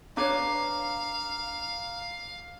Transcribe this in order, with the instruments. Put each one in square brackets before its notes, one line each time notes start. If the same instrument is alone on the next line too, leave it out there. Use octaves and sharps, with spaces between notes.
[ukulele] D4 B4 C#5 [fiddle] F5 [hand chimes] A#5 D6